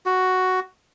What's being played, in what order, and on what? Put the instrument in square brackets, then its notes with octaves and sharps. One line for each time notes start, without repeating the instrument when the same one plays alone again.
[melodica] F#4